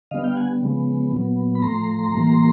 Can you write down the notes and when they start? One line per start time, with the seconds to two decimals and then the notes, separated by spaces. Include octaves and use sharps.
0.11 D3 G3 B3 D#5 F5
0.24 F5 G5
0.36 F#5 G#5
0.61 C#3 F3 G#3 B3
1.12 A#2 F#3 B3
1.55 B5
1.62 A2 F3 A3 A#5 C6
2.13 A2 E3 G3 A#3